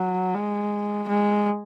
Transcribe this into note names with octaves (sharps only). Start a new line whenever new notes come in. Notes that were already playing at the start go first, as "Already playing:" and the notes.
Already playing: F#3
G#3
G#3